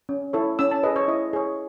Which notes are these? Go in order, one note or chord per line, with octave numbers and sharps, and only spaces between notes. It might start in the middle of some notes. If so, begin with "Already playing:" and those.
C#4
E4 A4 C#5
C#4 E6
A5
G#4 B4 D#5
C#5
E4 D#5
G#4 C#5